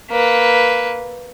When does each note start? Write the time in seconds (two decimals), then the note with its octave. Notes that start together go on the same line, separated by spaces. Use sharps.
0.10 A#3 B4